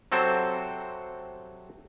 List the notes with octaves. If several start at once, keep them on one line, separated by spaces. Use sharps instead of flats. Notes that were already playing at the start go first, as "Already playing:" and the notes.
C3 F#3 C4 A4 C5